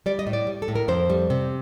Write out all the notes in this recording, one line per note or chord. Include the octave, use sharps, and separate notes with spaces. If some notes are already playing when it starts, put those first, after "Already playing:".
G3 D5
D#5
A2
D5
G3
A4
A2
A#4
F2 C5
G3
C3